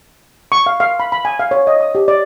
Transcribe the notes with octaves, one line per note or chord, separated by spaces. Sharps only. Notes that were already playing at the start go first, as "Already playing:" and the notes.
C#6
F5
F5
B5
B5
G#5
F5
C#5
D#5
D#6
G4
D5